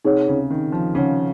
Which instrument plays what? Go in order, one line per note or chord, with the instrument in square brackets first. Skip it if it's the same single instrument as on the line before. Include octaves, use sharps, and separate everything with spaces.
[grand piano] C3 [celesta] D#4 G#4 C#5 F#5
[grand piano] C#3
D#3
F3
[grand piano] C#3 [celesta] D#4 G#4 C#5 F#5